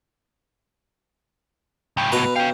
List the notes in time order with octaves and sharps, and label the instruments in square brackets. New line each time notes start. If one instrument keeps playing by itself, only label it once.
[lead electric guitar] C#2 A2 [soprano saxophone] G5
[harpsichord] B2 A#5 [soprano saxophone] B4
[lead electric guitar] C#5 F5 [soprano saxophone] G5